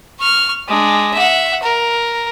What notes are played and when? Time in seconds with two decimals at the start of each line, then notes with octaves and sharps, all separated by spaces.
0.20 C#6 F6
0.68 G#3 D4
1.14 E5 F#5
1.63 A#4